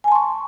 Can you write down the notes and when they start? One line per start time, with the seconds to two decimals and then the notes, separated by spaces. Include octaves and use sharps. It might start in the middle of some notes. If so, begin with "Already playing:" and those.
0.04 G#5
0.08 A5
0.12 C6
0.15 C#6